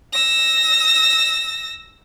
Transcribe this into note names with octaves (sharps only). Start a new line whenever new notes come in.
E6 A#6